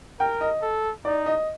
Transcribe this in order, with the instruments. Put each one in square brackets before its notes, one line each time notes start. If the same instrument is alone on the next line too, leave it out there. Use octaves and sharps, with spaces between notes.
[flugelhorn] A#4 [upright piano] G5
[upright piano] D#5
[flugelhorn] A4
[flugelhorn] D#4 [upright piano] D5
[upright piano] D#5